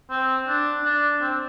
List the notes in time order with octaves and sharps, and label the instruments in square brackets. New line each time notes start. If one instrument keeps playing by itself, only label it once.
[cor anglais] C4
D4
D4
C4